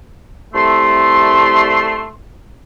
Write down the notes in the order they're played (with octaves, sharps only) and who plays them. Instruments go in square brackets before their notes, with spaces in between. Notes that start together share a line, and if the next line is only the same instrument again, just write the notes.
[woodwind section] C2 A3 C6